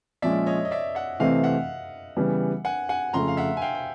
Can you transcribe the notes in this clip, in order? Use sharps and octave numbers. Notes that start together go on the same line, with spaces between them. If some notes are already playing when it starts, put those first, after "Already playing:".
A#2 F3 G#3 C#4 D5 E5
C#5 D#5
D#5
D5 E5
E5 F#5
C3 E3 A3 C4 D#5 F5
E5 F#5
C#3 E3 G3 B3
F#5 G#5
F#5 G#5
F2 C#3 F3 A3 A#5 C6
F5
E5 F#5
G#5
F5 G5
G5